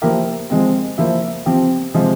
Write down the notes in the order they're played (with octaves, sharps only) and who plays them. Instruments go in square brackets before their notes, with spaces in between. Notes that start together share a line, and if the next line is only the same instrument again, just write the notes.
[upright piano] F3 A#3 E4 G4 A#4
F3 G#3 C4
F3 A#3 E4
F3 C4 G4
C3 F3 G#3